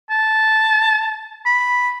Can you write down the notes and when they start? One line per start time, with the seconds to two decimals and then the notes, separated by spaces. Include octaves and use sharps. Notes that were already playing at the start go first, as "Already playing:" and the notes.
0.10 A5
1.46 B5